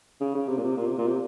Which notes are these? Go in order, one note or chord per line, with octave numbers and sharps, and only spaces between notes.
C#3
C#3
C3
A#2
C3
A#2
C3
A#2
C3